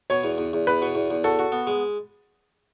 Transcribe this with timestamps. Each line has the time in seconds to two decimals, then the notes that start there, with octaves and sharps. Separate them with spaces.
0.10 B2 C#5
0.24 E2
0.38 E2
0.53 E2
0.67 E2 B4
0.82 B2
0.95 E2
1.10 E2
1.24 F#4 A4
1.39 F#4
1.52 B3
1.67 G#3